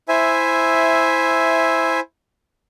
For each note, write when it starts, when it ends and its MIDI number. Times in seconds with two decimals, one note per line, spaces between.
0.09 2.00 64
0.09 2.00 72
0.09 2.00 76
0.09 2.00 80